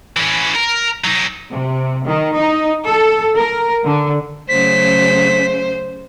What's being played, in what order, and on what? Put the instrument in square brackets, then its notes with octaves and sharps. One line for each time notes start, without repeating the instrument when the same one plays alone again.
[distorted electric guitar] E3 C#4
A#4
F#3 D#4
[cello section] C3
D#3
D#4
A4
A#4
D3
[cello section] C#3 F#3 A3 [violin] C5 [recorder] B6